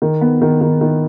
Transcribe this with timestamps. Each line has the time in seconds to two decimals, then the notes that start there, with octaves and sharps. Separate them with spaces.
0.02 D#3
0.21 B3
0.42 D#3
0.61 D#3
0.81 D#3